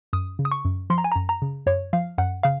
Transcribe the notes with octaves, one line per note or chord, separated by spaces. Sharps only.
F#2 D#6
C#3
D#6
C#6
F#2
F3 C6
A#5
G#5
F#2 A#5
A#5
C#3
F#2 C#5
F3 F5
F#2 F#5
C#3 F5